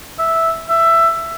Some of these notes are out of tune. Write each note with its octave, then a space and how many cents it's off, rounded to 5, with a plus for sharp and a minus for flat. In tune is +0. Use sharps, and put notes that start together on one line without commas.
E5 -5
E5 +15